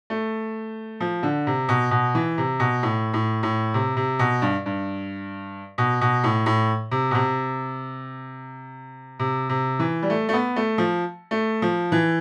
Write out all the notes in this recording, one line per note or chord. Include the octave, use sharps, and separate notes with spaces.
A3
F3
D3
C3
B2
B2
E3
C3
B2
A2
A2
A2
C3
C3
B2
G2
G2
B2
B2
A2
A2
C3
B2
C3
C3
C3
E3
G3
A3
A3
B3
A3
F3
A3
F3
E3